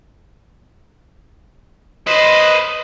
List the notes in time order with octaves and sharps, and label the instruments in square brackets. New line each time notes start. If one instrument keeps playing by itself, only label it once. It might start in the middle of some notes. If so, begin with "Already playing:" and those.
[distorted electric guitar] B4 C5 [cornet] D#5